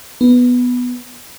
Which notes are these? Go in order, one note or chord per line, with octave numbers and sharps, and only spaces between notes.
B3